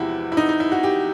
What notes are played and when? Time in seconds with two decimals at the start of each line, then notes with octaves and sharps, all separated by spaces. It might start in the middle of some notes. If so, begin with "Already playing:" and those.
Already playing: E2 C3 F3 G#3 E4 F#4 G4
0.32 E4
0.37 D#4
0.49 D#4
0.60 E4
0.72 F#4
0.83 G4